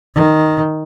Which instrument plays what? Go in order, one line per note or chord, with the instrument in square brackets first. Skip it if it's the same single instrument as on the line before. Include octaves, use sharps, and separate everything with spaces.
[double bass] D#3